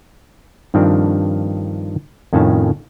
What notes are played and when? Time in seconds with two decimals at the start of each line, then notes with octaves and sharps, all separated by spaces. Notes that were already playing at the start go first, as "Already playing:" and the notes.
0.74 G2 D#3 F3 C4 D4
2.33 F2 A2 D#3 C#4 A5